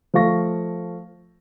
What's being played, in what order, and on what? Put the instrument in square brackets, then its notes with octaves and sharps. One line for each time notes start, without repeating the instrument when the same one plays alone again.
[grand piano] F3 A3 F5 C#6 A#6